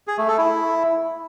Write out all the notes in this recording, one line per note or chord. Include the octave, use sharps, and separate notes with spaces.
G#4
A3
A4
E4